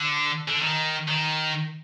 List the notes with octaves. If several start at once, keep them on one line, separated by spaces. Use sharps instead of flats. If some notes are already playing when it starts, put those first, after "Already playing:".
Already playing: D3
D3
D#3
D#3